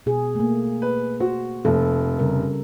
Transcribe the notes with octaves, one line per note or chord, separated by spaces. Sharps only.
B2 G#4
A3 A#3
B4
F#4 C5
F1 A4
C#3 G3 A#4